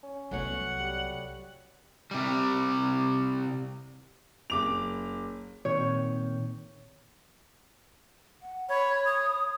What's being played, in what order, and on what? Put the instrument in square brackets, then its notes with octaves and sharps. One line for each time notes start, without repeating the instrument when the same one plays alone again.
[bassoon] C#4
[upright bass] C2 B3 [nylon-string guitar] F#3 A3 C#5 [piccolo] F#5
[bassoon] G3
[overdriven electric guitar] C3 G3
[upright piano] F#1 D6 F7
[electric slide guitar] A#2 D#3 C4 [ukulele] C#5
[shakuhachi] F#5
[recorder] C#5 [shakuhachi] B5
[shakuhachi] D#6